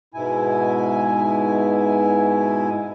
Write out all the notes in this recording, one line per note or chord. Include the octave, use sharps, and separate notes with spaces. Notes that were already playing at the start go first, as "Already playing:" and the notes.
G#2 B2 E4 G#5